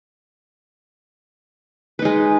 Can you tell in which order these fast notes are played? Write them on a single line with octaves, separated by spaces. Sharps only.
B4 D#4 G#3